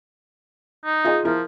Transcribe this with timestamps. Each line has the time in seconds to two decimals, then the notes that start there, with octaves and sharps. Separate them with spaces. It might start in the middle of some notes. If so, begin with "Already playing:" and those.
0.85 D#4
1.04 F4 G#4 D#5
1.25 F3 E4 A#4